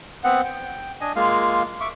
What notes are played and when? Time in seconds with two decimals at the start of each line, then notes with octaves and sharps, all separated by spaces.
0.24 B3 C4 F#5
0.44 G5
1.01 D4 D#5 G#5
1.16 G#3 A#3 F4 F5
1.81 E5 C#6 D6